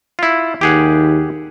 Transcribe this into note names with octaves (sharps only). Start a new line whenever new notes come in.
E4 F4
D#2 G4 G#4 F#5